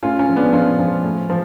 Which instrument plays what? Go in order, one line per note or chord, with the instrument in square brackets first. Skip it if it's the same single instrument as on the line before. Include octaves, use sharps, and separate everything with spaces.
[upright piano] A2 C#4 F4
C#4
F3
B3 D4
F3 C#4 F4
F3
A2
F3